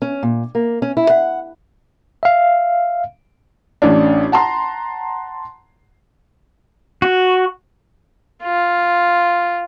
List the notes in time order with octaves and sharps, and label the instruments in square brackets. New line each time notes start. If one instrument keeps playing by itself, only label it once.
[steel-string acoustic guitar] C#4
A#2
A#3
C#4
E4
F#5
[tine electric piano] E5 F5
[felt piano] A1 C#4 D4
F#5 A5 A#5 C6
[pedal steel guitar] F#4
[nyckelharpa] F4